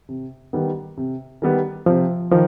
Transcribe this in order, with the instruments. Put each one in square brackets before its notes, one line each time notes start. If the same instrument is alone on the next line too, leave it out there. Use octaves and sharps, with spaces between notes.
[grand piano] C3
D#3 G3 B3
C3
D#3 G3 B3
[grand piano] C3 [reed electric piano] F3
[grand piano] D#3 [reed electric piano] F3